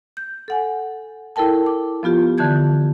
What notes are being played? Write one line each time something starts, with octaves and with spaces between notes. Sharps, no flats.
G6
A4 F#5 G#5
E4 A4 A#4 G5 A5
D6
F3 B3 F4 G4
D3 E3 A5 G6 G#6